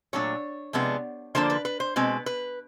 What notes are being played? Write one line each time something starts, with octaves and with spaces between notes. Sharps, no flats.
A#2 F#3 A3 D4 C#5
C3 F3 G#3 B3 D4
D3 F3 A#3 D4 C5
B4
B4
C5
B2 G#3 C4 B4
B4